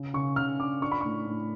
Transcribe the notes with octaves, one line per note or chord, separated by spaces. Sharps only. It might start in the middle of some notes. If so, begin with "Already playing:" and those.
Already playing: C#3
C#3 C#6
C#3 F6
D4 D6
D4 C#6
B5
A2 C#6
A2